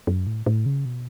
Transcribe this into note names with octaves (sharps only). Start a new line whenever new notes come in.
F#2
A2
A2
C#3
B2